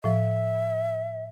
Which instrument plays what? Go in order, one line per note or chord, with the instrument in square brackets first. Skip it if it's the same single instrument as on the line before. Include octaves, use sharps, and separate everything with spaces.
[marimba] A2 F3 [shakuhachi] E5